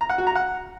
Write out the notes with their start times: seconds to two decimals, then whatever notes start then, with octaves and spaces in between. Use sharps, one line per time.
0.01 A#5
0.09 F#5
0.18 F#4
0.27 A#5
0.35 F#5